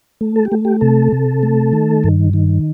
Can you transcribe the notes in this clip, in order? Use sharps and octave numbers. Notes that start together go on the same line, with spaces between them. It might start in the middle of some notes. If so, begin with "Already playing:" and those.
A3
A4
G4
A3
G4
C3 A4
C3
A3
D#3
G2
D#3